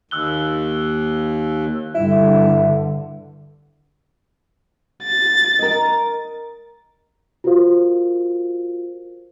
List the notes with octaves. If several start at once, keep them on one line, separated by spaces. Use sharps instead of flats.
D#2 E6 F#6 G7
G2 D3 E4
A6
A#4 D#5
F4 F#4 A#4 C5 F5